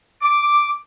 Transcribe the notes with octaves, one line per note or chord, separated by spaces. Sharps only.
D6